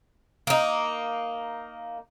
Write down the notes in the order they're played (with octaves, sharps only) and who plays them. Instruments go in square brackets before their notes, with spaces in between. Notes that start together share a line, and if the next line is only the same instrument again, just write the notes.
[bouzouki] A#3 D#4